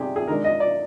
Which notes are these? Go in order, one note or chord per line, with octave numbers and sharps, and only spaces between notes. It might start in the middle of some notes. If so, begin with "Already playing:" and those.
Already playing: C3 G3 D4 G4 G#4
G#4
D#3 G#3 D4 A#4
D#5
D5